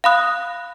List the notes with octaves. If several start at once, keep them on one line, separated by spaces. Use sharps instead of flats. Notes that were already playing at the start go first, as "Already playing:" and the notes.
F5 B5 D#6 F#6